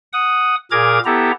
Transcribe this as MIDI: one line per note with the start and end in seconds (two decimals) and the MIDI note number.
0.13 0.55 78
0.13 0.55 87
0.71 0.99 46
0.71 0.99 68
0.71 0.99 70
0.71 0.99 82
0.71 0.99 86
0.71 0.99 92
1.05 1.31 59
1.05 1.31 64
1.05 1.31 67
1.05 1.31 69
1.05 1.31 82